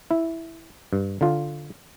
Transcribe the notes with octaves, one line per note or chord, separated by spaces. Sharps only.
E4
G2
D3 F4